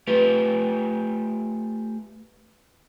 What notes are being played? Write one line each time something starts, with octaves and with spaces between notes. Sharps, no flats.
A3 F4 G4 B4